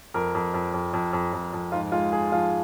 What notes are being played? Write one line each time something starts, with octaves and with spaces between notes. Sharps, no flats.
F2 A#4
F2
F2
F2
F2
F2
F2
F2
G#2 F4
G#3 F4
G#2 G#4
F3 F4